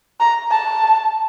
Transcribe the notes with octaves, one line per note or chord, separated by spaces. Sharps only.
A#5
A5